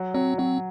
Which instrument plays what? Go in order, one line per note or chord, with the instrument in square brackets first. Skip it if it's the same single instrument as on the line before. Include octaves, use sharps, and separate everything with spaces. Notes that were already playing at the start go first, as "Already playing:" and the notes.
Already playing: [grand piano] F#3
[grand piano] F#3 [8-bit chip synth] C4
[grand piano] F#3 [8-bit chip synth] C4